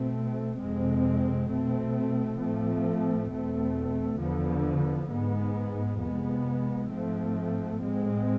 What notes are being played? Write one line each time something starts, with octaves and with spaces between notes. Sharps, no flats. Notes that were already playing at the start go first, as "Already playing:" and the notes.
Already playing: B2 A3 C4
F2 C3 G#3 C4
B2 A3 C4
A2 F3 A3 C4
E2 B2 A3 C4
E2 D3 F3 B3
G#2 G#3 B3
F2 C3 G#3 B3
G#2 F3 A3 C4
A2 G#3 C4